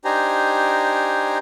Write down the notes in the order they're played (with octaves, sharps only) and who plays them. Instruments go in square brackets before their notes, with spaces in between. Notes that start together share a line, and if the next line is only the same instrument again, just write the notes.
[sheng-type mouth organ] D4 D#4 G4 C5 G#5 A#5